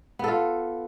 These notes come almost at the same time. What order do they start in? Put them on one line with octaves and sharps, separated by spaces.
B3 A4 F4